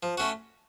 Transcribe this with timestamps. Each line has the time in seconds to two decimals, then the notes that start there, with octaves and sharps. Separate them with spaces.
0.03 F3
0.18 A3 C#4 F#4